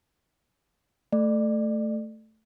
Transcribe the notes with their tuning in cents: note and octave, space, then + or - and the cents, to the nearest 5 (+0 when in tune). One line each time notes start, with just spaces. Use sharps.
A3 +0 D5 +30